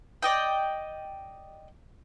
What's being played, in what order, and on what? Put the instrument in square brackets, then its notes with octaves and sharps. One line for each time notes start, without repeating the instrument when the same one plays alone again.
[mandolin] D5 D#5 G5